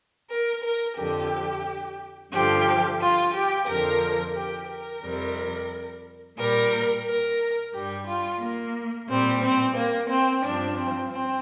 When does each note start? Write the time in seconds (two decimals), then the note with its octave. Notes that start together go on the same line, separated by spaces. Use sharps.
0.29 A#4
0.63 A#4
0.97 F2 D3 F3 G4
2.32 G2 D3 F3 G4
3.00 F4
3.33 G4
3.67 F2 D3 F3 A#4
4.34 G4
4.68 A#4
5.03 F2 C3 G3
6.37 A#2 G3 A#4
7.05 A#4
7.73 G2 G3 G4
8.06 F4
8.40 A#3
9.08 A#2 G3 C4
9.42 C4
9.76 A#3
10.09 C4
10.43 G2 F3 D4
10.77 C4
11.11 C4